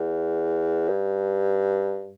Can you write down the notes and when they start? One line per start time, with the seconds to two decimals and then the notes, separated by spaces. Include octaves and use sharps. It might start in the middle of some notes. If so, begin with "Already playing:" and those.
Already playing: E2
0.89 G2